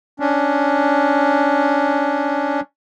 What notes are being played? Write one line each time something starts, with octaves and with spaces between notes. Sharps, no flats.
C#4 D4